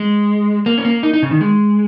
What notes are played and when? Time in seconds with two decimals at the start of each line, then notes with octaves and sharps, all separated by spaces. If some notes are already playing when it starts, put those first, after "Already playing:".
Already playing: G#3
0.66 A#3
0.78 C#4
0.85 A#3
1.03 D#4
1.13 D#4
1.23 C#3
1.31 D#3
1.41 G#3